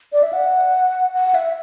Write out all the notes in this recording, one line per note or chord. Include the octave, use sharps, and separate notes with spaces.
D5
E5
F#5
F#5
E5